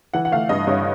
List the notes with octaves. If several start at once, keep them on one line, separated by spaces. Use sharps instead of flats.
E3 F#5
F#5
A3 F5
G2 D#5
G2 C#5